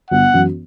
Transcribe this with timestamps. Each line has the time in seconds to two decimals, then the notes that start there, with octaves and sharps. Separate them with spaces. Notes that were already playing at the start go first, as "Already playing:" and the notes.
0.11 G1 F#5
0.34 F#2 E3